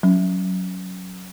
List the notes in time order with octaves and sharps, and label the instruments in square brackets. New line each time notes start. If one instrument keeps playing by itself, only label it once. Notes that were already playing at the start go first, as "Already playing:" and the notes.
[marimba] F#3 C#4